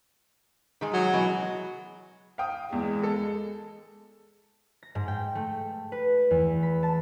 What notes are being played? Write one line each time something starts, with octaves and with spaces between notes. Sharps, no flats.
D#3 G#3 G#4
F#3
B2 E3 G#3
F5 G5 D#6
E2 G#3
A4
A#6
G#2
G5
A3
B4
E2
B5
A5